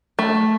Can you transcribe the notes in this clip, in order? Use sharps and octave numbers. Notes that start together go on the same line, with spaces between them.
A3